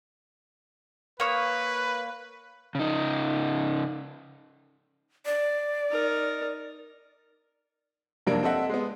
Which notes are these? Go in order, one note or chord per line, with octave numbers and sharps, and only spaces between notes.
A#3 B4 C#5 D#6
C#3 D#4
D5
D#4 A#4
F1 G2 F#3 A#3 D4 D7
C4 A4 D#5 E5 F#5
G#3 B3